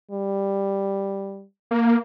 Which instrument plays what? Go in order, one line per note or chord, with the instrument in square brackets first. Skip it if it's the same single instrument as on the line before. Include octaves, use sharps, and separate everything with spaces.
[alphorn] G3
[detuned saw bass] A#3